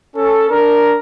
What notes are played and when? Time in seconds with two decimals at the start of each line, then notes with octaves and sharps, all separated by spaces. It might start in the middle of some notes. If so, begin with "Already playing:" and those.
0.15 C#4 A4
0.50 D4 A#4